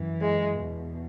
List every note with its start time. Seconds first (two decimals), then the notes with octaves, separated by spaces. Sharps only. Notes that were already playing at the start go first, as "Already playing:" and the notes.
Already playing: F#2 E3
0.20 G#3
0.58 E2 B2